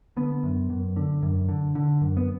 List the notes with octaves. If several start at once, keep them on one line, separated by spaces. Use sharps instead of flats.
D3 B3
F#2
F#2
D3
F#2
D3
D3
F#2
B3